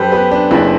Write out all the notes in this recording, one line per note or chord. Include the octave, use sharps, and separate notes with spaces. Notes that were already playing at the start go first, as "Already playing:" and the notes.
Already playing: F#2 G4 A4 B4 C5
B3 G4 B4
D4
F#1 E4